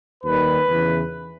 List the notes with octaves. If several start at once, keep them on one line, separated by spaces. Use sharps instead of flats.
D#2 D#3 G3 B4
E2 C#3 E3